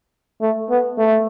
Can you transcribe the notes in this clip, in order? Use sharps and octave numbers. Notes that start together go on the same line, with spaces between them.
A3
B3
A3